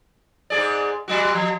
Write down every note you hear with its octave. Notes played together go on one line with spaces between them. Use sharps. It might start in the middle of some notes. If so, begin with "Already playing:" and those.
G#2 G#4 D5
F#3 G3 F#4
F3